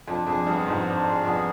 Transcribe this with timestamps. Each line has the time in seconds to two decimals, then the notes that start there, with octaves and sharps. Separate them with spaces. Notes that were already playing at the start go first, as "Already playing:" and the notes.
0.07 F2 D4
0.27 F2 G#4
0.46 G2 B3
0.66 F2 G#2 C5
0.87 D4
1.06 G#4
1.25 F2 B3